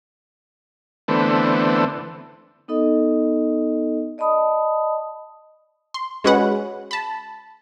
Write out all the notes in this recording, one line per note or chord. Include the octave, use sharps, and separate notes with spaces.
D3 E3 A3 B3 C4
B3 D#4 A4 D#5
D5 D#5 A5 B5 D#6
C6
G#3 C#4 F#4 B4 F#5
A5 B5